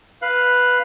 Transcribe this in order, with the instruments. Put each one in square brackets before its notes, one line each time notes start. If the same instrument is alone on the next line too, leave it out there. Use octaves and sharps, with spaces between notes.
[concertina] B4 F5 F#6